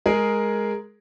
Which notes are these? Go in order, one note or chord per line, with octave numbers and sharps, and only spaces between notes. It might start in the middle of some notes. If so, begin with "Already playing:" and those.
G#3 G#4 A#4